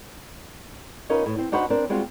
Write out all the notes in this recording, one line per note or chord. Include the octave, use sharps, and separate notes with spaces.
C#4 D#4 F4 A#4 B4
A2
C4
D4 D#4 F#4 B4 C5 F#5
C4 D4 A#4
G3 G#3 C4 F4 F#4